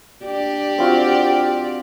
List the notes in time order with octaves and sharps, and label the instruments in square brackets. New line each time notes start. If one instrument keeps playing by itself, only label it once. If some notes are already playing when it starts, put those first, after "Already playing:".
[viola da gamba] D4 G4 D5
[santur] C4 F4 F#4